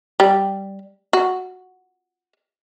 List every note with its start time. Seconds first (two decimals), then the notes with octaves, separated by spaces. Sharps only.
0.20 G3
1.13 F#4